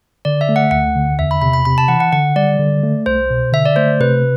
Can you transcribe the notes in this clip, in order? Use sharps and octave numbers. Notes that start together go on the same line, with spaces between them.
D3 D5
E5
A3
F#5
D2 F#5
D3
E2 E5
B5
C3 B5
B5
C3 B5
A5
E3 F#5
F#5
D3 F#5
G3 D5
D3
A3
C2 C5
B2
D3 E5
D5
A3 C5
C3 B4